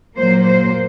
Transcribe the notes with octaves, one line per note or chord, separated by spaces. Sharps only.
A#2 F#3 A#3 C5
C5